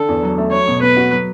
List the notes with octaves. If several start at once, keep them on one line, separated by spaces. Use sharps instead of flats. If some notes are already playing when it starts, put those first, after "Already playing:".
Already playing: D3 A4
E2
F#3
A3
F#3 C#5
B2
B3 B4
F#4
F#3